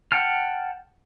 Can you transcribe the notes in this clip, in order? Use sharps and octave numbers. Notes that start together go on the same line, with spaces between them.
F#5 G5 A5 F6